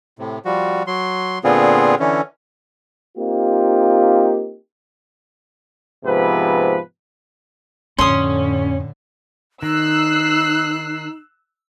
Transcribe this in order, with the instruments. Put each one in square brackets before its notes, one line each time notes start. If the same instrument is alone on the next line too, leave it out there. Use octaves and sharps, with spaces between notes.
[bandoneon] A2 C3
F3 G3 F#4
F#3 C6
A#2 D3 B3 C4 F4 G#4
D3 E3 C#4
[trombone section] A#3 C4 D#4 F4 G4
[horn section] G#2 C3 F3 B3 B4
[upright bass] F2 [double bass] A2 D3 [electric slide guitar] C#4 [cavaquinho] C6 D#6
[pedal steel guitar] D#3 [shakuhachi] D#4 [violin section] E6 F#6 C7